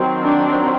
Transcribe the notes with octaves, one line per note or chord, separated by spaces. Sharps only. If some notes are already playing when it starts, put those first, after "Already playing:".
Already playing: D#3 F#3 C4
D4